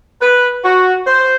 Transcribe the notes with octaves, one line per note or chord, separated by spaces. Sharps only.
B4
F#4
C5